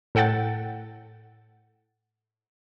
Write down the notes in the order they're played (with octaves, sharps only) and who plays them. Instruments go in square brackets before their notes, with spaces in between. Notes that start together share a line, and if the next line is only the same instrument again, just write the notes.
[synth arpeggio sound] A2 A4 F#5 G5 A6